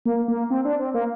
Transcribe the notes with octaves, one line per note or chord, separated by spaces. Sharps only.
A#3
A#3
C4
D4
C4
A#3